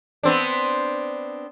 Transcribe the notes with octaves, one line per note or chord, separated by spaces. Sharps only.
B3 C4 D4